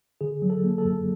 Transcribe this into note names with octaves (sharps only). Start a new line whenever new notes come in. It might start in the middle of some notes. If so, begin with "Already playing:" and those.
D3 G#4
F#3
A4
A#3
A4
F#2